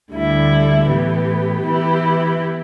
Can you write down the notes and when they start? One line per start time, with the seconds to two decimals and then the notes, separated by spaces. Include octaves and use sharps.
0.13 D2 D3 G3 E4
0.88 A2 E3 B3 G4
1.65 E3 B3 E4 G4